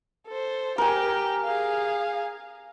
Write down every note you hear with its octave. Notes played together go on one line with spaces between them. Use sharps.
A4 C5
G4 A#4 G5 G#5
G#4 F5